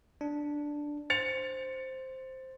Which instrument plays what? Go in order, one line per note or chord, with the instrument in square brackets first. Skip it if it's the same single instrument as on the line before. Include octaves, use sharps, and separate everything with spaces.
[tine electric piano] D4
[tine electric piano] C5 [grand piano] A6 C#7 F7